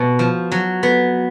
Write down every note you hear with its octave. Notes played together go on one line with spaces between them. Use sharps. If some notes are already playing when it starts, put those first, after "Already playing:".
Already playing: B2
F3
F#3
B3